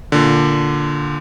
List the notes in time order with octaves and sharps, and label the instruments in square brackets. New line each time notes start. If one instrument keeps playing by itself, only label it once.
[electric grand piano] A#2 D3